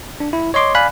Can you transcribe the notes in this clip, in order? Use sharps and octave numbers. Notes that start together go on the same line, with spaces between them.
D4
E4
C#5 D#5 C6 D6
D5 F5 G#5 B5 F#6